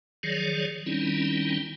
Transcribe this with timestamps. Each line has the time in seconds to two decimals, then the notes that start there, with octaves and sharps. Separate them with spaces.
0.23 D#3 F3 F#3 G#4 C#5 D5
0.86 D#3 G3 C4 C#4 D#4 E4